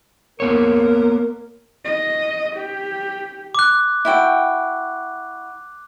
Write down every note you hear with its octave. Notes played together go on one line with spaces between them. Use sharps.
A#3 B3 A#4 C#5
D#5
G4
D6 F#6
E4 F#4 G5